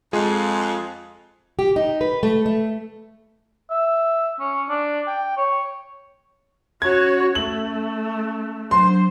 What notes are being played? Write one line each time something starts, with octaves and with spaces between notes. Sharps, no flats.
F2 G#3 F4 G#4
G4
D#4
B4
A3
A3
E5
C#4
D4
G5
C#5
C#4 F#4 C#5 G#6
A3 F#7
F#3 D4 C5 C6